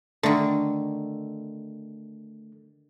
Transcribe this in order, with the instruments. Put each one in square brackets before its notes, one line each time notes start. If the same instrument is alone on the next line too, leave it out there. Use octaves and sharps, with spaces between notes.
[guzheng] D3 D#3 [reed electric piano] A3 A4